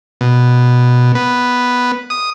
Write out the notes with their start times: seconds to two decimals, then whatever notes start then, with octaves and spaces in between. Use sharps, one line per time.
0.21 B2
1.15 B3
2.10 D#6